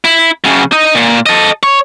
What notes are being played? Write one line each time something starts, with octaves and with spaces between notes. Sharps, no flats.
E4
F#2 C#3
D#4 D#5
A#2
A4 D#5
C#5